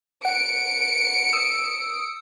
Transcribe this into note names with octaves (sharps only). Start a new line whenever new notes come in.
F#5 C#7 D7
D#6 E6